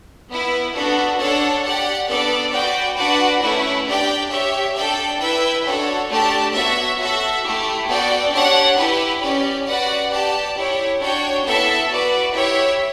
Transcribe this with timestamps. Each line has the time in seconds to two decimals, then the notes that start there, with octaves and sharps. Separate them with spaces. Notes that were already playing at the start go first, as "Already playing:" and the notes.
0.30 B3 E4 B4
0.75 B3 D4 F#4 A4
1.19 D4 A4 C#5 F#5 A5
1.64 G4 D5 F#5
2.08 B3 D4 A4 D5
2.53 F#4 B4 D5 G5
2.97 D4 F#4 B4 D5 F#5
3.42 A3 C#4 E4 B4
3.86 D4 G4 D5 G5
4.31 G4 C#5 E5
4.76 D4 A4 D5 G5
5.20 E4 B4 E5 G5
5.65 D4 F#4 A4 C#5
6.09 A3 D4 G4 D5 A5
6.54 B3 F#4 C#5 E5
6.99 F#4 A4 E5
7.44 A3 E4 G4
7.89 B3 F#4 A4 D5 G5
8.33 D4 G4 C#5 F#5
8.77 E4 G4 B4
9.22 C#4 G4 D5
9.67 F#4 B4 D5 F#5
10.11 G4 D5 A5
10.56 E4 G4 C#5
11.00 D4 F#4 C#5 G5
11.45 B3 E4 A4 E5 A5
11.90 F#4 B4 D5
12.34 E4 G4 C#5 E5